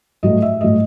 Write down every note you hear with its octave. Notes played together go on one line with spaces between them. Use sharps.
A2 F#3 A3 D#5
E5
A2 F#3 A3 D#5